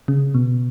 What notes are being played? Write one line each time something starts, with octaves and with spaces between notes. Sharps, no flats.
C#3
B2